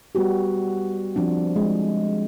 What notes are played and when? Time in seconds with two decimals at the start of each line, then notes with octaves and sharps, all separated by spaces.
0.15 G3 B3 F#4 G4
1.16 F3 C4 D4
1.56 G#3